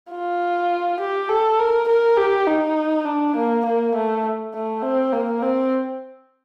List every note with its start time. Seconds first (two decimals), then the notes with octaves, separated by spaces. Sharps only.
0.11 F4
1.00 G4
1.29 A4
1.59 A#4
1.88 A#4
2.17 G4
2.47 D#4
3.06 D4
3.36 A#3
3.65 A#3
3.95 A3
4.54 A3
4.83 C4
5.13 A#3
5.42 C4